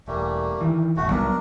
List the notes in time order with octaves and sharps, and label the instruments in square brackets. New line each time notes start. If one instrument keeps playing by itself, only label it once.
[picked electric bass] E1 [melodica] G3 A3 A#3
[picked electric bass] D#3 E3
[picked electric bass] E1 A1 [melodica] A3 F#4
[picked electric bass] C2 F#3 B3 [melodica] D4 A#4